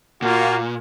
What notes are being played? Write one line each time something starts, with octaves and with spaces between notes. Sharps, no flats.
A#2 A#3 F4 F#4